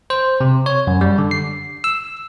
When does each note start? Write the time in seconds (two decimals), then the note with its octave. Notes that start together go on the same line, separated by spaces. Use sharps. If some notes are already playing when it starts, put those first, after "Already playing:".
0.10 C5
0.41 C3
0.66 C#5
0.87 F#2
1.01 G3
1.18 D3
1.31 C7
1.84 E6